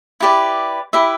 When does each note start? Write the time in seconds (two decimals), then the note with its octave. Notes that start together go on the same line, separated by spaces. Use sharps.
0.20 E4 G4 B4 D5
0.93 E4 G4 B4 E5